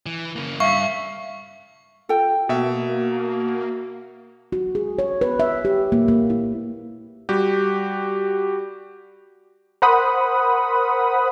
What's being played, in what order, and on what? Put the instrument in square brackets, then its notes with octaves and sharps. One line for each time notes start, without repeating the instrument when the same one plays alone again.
[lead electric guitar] E3
C#3 A#3
[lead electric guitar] G2 [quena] E5 [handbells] F5 [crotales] C#6
[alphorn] F4 [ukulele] A4 G5
[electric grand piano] B2 E5 [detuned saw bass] A#3 [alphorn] F#4
[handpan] F#4
G#4
C#5
B4
E5
G4
A#3
A#3
E4
[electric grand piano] G3 F#4 G4
[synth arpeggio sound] A#4 C5 F#5 B5 D#6